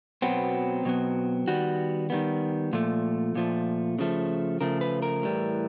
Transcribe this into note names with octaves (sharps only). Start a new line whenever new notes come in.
B2 F#3 B3 C4
B2 F#3 B3
D#3 G3 B3 F#4
D#3 G3 B3
A#2 F3 A3
A#2 F3 A3
C#3 F3 A3
C#3 F3 A3 A#4
B4
A#4
A2 E3 G3